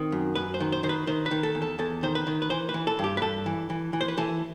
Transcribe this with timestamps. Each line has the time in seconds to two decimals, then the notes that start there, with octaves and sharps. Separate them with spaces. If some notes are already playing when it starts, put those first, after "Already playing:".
Already playing: D#3 C4
0.12 F#2
0.35 F#2 B4
0.54 C5
0.60 D#3
0.72 C5
0.83 D#3 C5
0.89 B4
1.07 D#3 C5
1.26 B4
1.31 D#3
1.43 A4
1.55 E2
1.62 A4
1.79 E2 A4
2.03 D#3 C5
2.15 B4
2.27 D#3
2.42 B4
2.50 E3 C5
2.69 B4
2.74 E3
2.87 A4
2.99 G2 G4
3.17 B4
3.22 G2 A4
3.46 E3
3.70 E3
3.93 E3
4.01 C5
4.08 B4
4.18 E3 A4